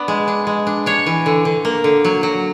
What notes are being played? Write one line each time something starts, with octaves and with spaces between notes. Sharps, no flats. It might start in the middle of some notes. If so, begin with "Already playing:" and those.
Already playing: B3 D4 D5
G#3
D4
G#3
D4
D4 C#5
E3
D3
D3
A#3
D3
F#3
F#3